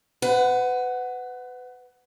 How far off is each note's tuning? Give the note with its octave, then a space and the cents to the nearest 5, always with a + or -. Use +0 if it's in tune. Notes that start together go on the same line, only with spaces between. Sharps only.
B4 +30 F#5 +0